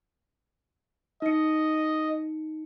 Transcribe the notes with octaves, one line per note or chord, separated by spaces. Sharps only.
D#4 D#5 C#7